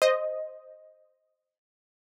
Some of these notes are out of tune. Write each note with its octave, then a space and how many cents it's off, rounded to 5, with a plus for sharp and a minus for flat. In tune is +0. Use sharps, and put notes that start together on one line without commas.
C5 +0 D#5 +0